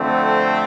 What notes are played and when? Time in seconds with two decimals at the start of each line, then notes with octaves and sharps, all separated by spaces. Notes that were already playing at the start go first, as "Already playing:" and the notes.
Already playing: F2 D3 A3 C4